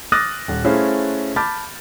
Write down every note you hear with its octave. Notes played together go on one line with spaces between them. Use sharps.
D6 D#6 F6 F#6 A6 A#6
D#1 F#5
A3 C#4 E4 G#4 C5 F5
A5 B5 D6 F6 G6 A6